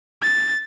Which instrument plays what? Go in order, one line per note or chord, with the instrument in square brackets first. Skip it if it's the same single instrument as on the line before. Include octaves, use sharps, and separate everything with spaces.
[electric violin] A6